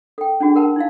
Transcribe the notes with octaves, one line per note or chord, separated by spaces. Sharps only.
A4 G5
C#4 D4 F#4 G#4
A#4 B4 F#5 A5
D#4 E4 F5